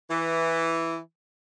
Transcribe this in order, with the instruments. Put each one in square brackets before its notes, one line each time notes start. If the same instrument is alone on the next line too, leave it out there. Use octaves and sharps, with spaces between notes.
[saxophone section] E3